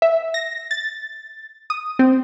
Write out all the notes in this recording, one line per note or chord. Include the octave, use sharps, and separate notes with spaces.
E5
A#6
A6
D#6
C4